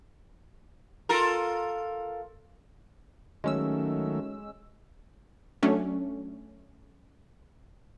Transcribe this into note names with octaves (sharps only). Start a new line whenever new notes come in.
F4 A4 A#4
D#3 F#3 G#3 A3 C#4 E6
F#3 A3 C#4 D4